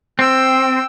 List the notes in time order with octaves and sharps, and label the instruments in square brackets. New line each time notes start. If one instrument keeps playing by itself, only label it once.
[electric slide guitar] C4 [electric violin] G5 E6